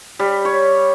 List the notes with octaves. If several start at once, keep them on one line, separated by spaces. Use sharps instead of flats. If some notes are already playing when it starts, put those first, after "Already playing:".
G3
C#5